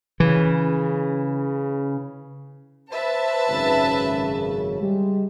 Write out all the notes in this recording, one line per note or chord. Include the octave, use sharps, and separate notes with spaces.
C#3 E3
B4 C5 E5 A5
G#1 F#2 C#3
G3 G#3 G4